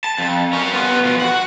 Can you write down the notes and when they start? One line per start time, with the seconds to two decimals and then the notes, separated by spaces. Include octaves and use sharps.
0.04 A5
0.18 F2
0.53 C#4 A#4
0.73 B3 F4
1.04 B2 F3
1.20 F#4 F#5